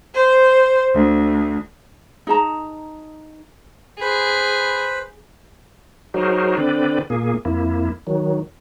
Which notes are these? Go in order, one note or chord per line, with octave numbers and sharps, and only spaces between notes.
C5
D2
D#4 G#4 A5 A#5
G#4 B4 C5 B5
F#3 D#4 F#4 G#4 A#4 C5
D3 C4 B4 D5
A#2 A#3 G#4
F2 A#3 E4
D#3 F#3